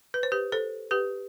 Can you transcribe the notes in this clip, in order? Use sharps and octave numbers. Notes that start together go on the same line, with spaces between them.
B4
C5
G4 B4
A4 C5
G4 B4